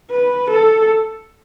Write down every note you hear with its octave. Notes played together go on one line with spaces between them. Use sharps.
B4
A4